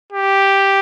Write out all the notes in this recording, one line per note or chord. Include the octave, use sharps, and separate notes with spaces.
G4